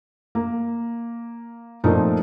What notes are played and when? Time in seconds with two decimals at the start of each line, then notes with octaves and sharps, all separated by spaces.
0.35 A#3
1.84 A#2 F3 A3 C4 D#4 A#4